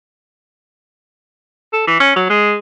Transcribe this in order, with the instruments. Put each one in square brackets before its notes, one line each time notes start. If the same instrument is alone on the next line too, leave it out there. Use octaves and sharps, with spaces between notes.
[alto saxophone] A4
E3
C#4
F#3
G#3